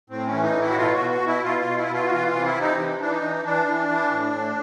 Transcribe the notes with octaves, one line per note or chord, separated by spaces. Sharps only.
A2 C4
C#4
E3
D#4
A2
E4
F#4
B2 F4
F#4
B2
F#4
B2
E4
B2 F4
F4
B2
E4
B2
F4
F#4
E3 F4
F4
C3
E4
C3
D#4
E3
E3 D4
D#4
E3
E3 D4
E3
E3
A2
A2